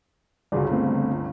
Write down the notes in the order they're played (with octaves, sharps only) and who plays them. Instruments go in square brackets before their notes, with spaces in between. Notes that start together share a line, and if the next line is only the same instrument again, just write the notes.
[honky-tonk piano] G1 C#2 [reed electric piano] F#4 G#4 D5
[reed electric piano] A3 B3 C4